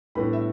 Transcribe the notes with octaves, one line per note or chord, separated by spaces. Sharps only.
A2 G3 B3 D4 B5
E5